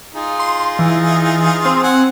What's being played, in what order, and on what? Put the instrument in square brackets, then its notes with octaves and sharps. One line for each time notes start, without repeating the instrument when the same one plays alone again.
[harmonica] D#4 F4 G#4
[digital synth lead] C6
E3
C4
[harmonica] F#5 G#5